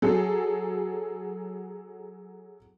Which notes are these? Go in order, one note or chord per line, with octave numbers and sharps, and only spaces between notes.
F#3 G#4 A4